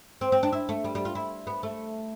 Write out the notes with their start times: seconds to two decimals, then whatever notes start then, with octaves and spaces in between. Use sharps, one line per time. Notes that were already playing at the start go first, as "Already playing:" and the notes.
0.21 C4
0.32 C4
0.43 D4
0.52 E4
0.69 A3
0.84 G3
0.95 G3
1.05 F4
1.15 E4
1.47 B3
1.63 A3